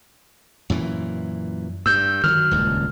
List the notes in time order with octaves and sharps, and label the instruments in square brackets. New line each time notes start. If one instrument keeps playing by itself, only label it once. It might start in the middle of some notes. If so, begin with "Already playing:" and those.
[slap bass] F#2 A#2 E3
[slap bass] G2 [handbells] E6 G6
[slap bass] D#3 F3 F#3 [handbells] F6
[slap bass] D#1 C#2 G2